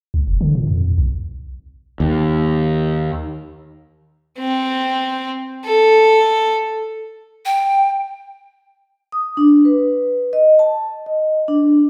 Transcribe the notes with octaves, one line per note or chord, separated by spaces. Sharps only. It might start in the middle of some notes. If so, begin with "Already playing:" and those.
C#2
F1
D3
A#2
F2
B1
D#2
C4
A4
G5
D#6
D4
B4
D#5
A5
D#5
D4